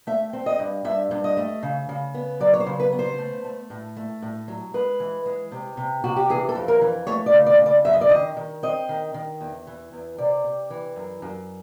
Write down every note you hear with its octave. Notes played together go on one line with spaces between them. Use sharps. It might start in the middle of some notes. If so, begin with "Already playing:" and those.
A3 E5
C4
D#5
G2
G2 E5
G2
D#5
A3
C#3
C#3
B3
F#3 D5
C#5
C5
C#3
B4
B3
C5
A3
A3
A2
A3
A2
F#3
G#3 B4
E3
G#3
C3
C3
C3 F#4
G4
E3 G#4
A4
F2
A#4
E3
A3 C#5
D5
C#3
D5
C#3
D5
F#2 E5
D#5
D5
D#3 D#5
D#3
C4 D#5
D#3
D#3
E2
E3
E2
C3 D5
C3
E3
F#2
F#2